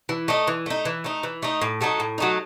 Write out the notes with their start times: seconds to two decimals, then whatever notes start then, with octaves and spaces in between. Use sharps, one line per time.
0.09 E3
0.28 A3 D#4
0.47 E3
0.66 A3 D#4
0.85 E3
1.04 A3 D#4
1.23 E3
1.43 A3 D#4
1.61 A2
1.81 F#3 A3 D#4
2.00 A2
2.18 F#3 A3 D#4